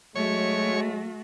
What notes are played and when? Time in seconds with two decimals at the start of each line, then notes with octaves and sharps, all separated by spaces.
0.15 F#3 G#3 A3 F#4 C#5